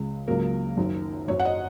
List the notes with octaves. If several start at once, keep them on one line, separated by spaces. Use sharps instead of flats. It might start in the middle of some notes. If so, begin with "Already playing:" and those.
Already playing: C#2 C#3 G#3
C#2 C#3 F#3 A#3 A#4
F#1 F#2 D#3
F#1 F#2 F#3 C#5
F#5
D#5